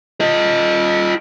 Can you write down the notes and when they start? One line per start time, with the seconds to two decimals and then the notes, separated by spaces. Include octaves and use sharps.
0.20 F4 D#5